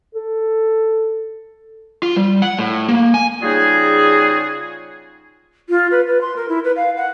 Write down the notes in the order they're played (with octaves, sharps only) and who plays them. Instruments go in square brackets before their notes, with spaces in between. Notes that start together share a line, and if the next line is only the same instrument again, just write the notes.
[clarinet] A4
[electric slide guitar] F4
G3
F#5
A2
A#3
G#5
[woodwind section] C#3 G3 D#4 F4 F#4 G#4
[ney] F4
B4
B4
C6
A#4
E4
B4
F5
F#5